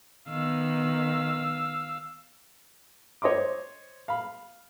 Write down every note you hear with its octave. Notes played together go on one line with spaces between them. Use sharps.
D#3 B3 F5 E6
C5 C#5 D#5 C6 D6
F5 B5